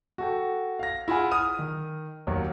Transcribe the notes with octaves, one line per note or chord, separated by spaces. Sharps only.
F#4 A4 G5
F5 A#6
E4 F4 G#4 F#5 G#5
D#6 F6 D#7
D#3
D#2 D#3 F#3